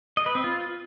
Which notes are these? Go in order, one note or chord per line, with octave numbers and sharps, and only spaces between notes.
D#5
B4
C4
F4